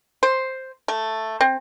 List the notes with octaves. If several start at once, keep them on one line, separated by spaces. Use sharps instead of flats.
C5
A3
C4